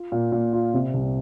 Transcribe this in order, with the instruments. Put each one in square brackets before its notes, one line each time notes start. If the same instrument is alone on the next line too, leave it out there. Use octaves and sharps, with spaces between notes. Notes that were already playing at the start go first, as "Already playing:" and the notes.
Already playing: [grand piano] F4
A#2
A#2
F4
C3
C2